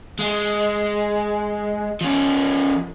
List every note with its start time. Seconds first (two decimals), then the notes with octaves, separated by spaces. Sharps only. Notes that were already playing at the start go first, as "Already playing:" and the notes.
0.19 G#3
2.01 F3 C#4